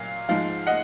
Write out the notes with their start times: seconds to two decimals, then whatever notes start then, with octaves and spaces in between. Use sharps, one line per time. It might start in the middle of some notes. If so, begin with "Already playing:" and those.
Already playing: A#2 F#3 F5
0.28 G#2 F3 G#3 F5
0.67 D#5 F#5